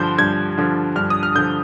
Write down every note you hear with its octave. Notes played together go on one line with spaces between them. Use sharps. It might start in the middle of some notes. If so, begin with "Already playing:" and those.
Already playing: G2 D3 F3 C6 G6
G2 G#6
D3 F3
G2 F6
D#6
F6
D3 F3 G6